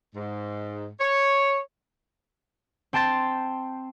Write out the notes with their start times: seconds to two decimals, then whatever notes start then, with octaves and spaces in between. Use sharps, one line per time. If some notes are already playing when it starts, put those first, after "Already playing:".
0.15 G#2
1.00 C#5
2.93 C4 G5 A5 C6 A6